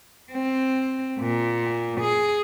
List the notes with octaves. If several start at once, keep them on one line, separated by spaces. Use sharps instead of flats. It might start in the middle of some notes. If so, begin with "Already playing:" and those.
C4
A#2
G#4